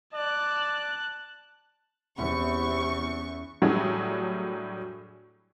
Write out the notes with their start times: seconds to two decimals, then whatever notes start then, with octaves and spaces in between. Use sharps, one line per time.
0.14 D5 A5 F#6
2.18 E2 C3 B3 C#4 E4 C#6
3.62 A2 F#3 G3 D4 G#4